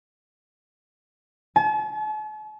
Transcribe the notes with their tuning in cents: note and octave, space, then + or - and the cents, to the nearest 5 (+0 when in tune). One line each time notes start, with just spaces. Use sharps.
A5 -45